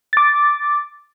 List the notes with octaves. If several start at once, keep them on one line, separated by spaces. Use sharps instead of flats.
D6 A6